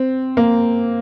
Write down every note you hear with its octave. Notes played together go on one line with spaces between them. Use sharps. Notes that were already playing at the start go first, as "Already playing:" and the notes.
Already playing: C4
A#3